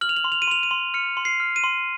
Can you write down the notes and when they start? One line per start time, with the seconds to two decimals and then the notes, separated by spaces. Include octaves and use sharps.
0.01 F6 F#7
0.09 F7
0.17 F#7
0.24 C6
0.32 F7
0.42 D#7
0.48 C6 F7
0.63 D#7
0.71 C6
0.94 F6 C#7
1.17 C6
1.25 C7
1.40 F6
1.56 D#7
1.64 C6